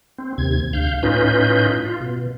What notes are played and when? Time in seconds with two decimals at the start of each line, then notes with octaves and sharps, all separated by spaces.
0.18 C4
0.38 D#2 C3 G#6
0.73 D2 F5 G6
1.03 A2 C#4 D#4 F4 B4 G6
1.85 F4
2.00 B2